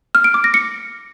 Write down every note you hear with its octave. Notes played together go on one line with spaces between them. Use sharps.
F6
D7
D6
A#6
C#7